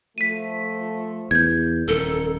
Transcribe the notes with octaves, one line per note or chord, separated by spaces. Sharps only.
F3 A3 B6 D#7
E2 G6 G#6
D#1 F2 A4 A#4